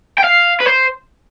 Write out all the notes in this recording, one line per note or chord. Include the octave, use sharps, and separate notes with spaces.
G5
F5
B4
C5